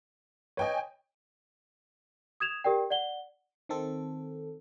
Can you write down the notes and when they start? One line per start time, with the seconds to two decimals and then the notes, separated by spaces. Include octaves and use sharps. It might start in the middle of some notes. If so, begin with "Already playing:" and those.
0.57 B4 C#5 D#5 G5 G#5
2.40 D#6 G#6 E7 F7
2.64 G4 A#4 D5 G5
2.90 D5 F#5 G7
3.69 D#3 C4 A4